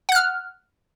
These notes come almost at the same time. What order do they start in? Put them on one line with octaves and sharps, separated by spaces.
F#5 F#6 F6